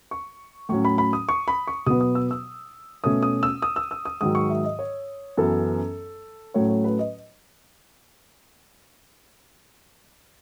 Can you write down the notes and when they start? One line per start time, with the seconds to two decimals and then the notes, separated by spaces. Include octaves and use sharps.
0.11 C#6
0.69 A2 F#3 C#4 C#6
0.85 B5
0.98 B5
1.13 D#6
1.29 C#6
1.48 B5
1.67 C#6
1.86 B2 F#3 B3 D#6
2.01 D#6
2.15 E6
2.31 E6
3.04 B2 A3 C#4 D#6
3.23 D#6
3.43 E6
3.62 D#6
3.76 E6
3.91 E6
4.05 D#6
4.21 G#2 D#3 F#3 D#6
4.35 C#6
4.50 E5
4.65 D#5
4.79 C#5
5.37 F#2 E3 B3 A4
6.54 A2 F#3 A3 C#4 C#5
6.69 C#5
6.84 B4
6.99 D#5